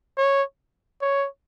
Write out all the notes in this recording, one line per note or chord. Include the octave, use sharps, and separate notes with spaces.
C#5
C#5